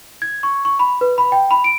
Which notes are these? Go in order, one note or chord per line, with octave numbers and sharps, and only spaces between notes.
G#6
C#6
C#6
B5
B4
B5
G5
B5
D7